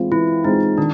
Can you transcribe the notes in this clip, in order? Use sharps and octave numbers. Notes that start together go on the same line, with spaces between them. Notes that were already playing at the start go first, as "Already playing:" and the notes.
Already playing: E3 G#3 C4 F4
E3 E4
G#3 C4 D#4 F4
D#3 D4